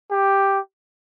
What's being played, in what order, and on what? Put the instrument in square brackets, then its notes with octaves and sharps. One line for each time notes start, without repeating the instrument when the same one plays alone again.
[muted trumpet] G4